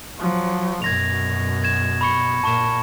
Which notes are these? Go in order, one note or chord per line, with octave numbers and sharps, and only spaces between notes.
F3 F#3
F#2 B2 G#6 A#6 F7
G#6 E7
B5 C#6 C#7
A#2 A5 C#6 E7